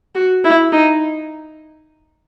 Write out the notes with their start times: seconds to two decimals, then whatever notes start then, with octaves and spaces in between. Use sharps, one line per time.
0.15 F#4
0.44 E4
0.73 D#4